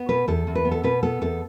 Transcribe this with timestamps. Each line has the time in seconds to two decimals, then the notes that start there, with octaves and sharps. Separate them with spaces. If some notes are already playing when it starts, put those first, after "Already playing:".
Already playing: B3
0.09 B2 B4
0.28 E2 A4
0.47 E2
0.55 B4
0.65 B3
0.71 A4
0.84 B2 B4
1.03 B3 A4
1.21 E2 A4